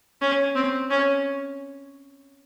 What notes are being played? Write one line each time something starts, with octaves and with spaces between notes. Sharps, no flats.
C#4
C4
C#4